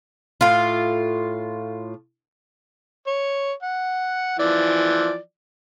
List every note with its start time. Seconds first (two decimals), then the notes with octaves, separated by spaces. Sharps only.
0.41 A2 F4
3.07 C#5
3.63 F#5
4.39 E3 F3 D5